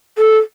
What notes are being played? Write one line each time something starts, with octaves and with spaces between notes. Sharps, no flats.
A4